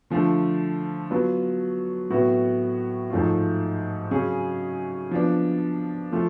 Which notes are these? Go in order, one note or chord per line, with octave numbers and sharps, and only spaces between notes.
D3 F3 A3
F#3 B3 F4 B4
A2 F#3 B3 F#4
G#2 F3 A3 F4
C#3 F#3 C#4 G#4
F3 B3 D4
F3 A3 F4